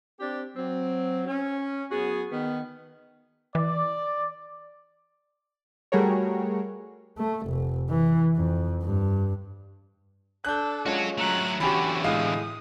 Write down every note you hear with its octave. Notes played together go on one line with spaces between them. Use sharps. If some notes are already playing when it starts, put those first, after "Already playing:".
C4 D4 G4
F#3 C4
C#4
F#2 B3 F#4 G#4
D#3 B3
E3 D5
G3 A3 F#4 G#4 A#4 C#5
A3
F1
E3
F2
G2
D4 A4 F#6 G6
G#3 C#4 F4 F#4 C#5
F#3 A3 A#5 F#6
E2 D3 C#4 F#4 G4 B5
A2 G#3 F5 D#6